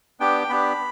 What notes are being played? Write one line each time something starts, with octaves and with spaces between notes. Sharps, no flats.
B3 D4 G4 G5
B3 D4 G4 B5